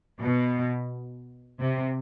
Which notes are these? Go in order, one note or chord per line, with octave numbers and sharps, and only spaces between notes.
B2
C3